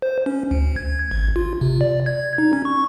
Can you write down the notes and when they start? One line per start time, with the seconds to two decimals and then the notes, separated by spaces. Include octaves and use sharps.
0.02 C5
0.26 C#4
0.51 D2
0.76 G#6
1.11 G#1
1.36 F4
1.61 C3
1.81 D5
2.06 G#6
2.38 D#4
2.53 C#4
2.65 C#6